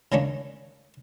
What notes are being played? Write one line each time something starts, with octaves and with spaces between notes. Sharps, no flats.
C#3 G#3 A#3 C#4 D4